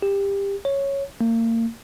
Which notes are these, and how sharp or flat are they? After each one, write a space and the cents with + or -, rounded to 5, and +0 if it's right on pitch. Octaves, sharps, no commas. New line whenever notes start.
G4 +20
C#5 -5
A#3 -35